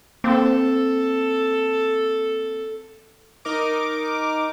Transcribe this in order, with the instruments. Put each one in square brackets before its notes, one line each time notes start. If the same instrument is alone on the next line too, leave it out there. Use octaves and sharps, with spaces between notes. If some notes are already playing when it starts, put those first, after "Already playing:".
[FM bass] A#3 [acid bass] C4 [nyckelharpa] A4
[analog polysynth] D#4 A#4 D6